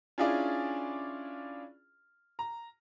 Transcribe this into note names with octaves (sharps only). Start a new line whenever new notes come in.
C#4 D4 E4 F4 G#4 D5
A#5